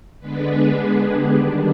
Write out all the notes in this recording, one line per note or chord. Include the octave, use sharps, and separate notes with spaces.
D3 G#3 B3 D4 B4
G#4
G4
D#3 G3 D4